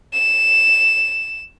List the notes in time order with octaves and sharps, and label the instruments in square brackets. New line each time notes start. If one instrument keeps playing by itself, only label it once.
[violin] E7